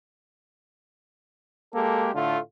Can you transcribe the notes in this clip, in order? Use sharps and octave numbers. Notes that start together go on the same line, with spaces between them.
G#3 A#3 G4 A4
A2 D3 A3 F4